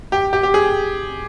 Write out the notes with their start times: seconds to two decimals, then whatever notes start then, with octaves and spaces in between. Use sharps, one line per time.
0.12 G4
0.33 G4
0.43 G4
0.54 G#4